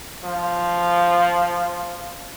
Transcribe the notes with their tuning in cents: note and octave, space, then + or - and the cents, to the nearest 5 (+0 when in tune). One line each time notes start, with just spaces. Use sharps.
F3 -5